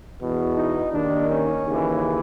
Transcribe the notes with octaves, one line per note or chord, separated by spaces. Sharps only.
E2 B2
D#4
D#2 D#3 D4
C#4
D#2 C#3 E3